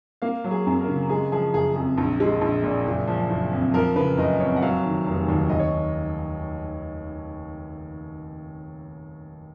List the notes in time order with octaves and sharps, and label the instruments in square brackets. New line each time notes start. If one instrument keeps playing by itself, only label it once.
[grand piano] A#3 F5
F#3
G#4
F#2
A#4
C#3
G#3 G#4
F3 G#4
F#1 G#4
F2 G#4
A#1
G#3
A#1
A#2
F#1
F3
F#1
F2
F3 A#4
C#3 B4
F#1 D#5
F2 C#5
F#5
F#3 F5
D#3
F1
D#2
D#2 D#5
C#5